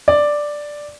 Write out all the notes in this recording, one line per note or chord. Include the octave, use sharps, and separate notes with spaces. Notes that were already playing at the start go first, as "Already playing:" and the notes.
D5